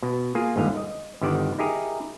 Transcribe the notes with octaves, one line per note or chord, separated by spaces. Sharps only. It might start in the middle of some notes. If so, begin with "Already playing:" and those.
B2
A#3 F4 G#4
G1 D#2 G#2 D3 D#5 F5
D#5
G1 D3 D#3 G3 B3 D5
D#4 E4 G4 G#4 A#4